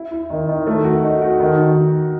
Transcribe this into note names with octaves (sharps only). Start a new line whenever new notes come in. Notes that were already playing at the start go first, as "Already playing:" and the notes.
Already playing: E4
E4
D#3
D#3
A3
F#4
D#4
F#4
D#3
D#3